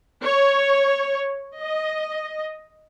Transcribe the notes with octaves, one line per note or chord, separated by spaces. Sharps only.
C#5
D#5